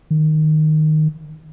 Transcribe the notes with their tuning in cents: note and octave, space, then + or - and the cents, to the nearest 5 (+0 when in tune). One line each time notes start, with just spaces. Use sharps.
D#3 -10